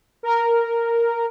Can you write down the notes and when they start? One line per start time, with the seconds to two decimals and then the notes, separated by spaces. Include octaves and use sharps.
0.23 A#4